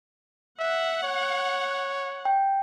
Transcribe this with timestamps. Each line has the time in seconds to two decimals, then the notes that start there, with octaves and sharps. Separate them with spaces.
0.59 E5 F#5
1.03 C#5
2.25 G5